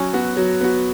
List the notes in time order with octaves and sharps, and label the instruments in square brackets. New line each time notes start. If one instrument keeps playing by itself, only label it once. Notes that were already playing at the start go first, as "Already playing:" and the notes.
Already playing: [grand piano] F#3 [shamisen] C#4
[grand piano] B3 F#4
F#3
B3 F#4